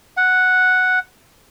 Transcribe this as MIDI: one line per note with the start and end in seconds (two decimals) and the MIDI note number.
0.17 0.99 78